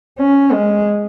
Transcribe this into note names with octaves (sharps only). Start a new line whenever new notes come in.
C#4
G#3